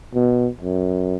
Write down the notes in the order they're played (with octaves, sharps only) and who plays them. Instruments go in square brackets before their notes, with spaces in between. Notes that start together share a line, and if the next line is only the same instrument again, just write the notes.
[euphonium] B2
F#2